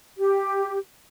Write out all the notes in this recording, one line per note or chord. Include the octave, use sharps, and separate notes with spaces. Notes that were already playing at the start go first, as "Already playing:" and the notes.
G4